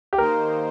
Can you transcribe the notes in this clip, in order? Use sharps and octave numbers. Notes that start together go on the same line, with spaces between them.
G4
D#3 A#3 D#4 A#4 C5